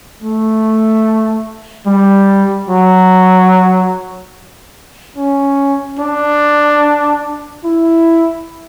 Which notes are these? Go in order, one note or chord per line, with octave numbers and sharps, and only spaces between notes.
A3
G3
F#3
C#4
D4
E4